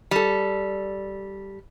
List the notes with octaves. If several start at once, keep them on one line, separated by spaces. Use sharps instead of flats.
G3 A4